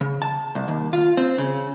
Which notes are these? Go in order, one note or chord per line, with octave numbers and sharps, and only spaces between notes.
C#3
A5
C2
D#2
F4
C4
C#3